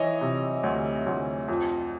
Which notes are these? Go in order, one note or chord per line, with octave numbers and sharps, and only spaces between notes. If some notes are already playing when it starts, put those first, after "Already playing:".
Already playing: E3 C#5 D#5
C3
D2
D2
F2